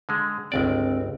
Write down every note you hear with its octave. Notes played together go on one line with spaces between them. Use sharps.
D3 G#3
G1 C#2 C4 D5